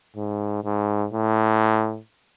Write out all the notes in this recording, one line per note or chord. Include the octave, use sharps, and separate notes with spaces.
G#2
G#2
A2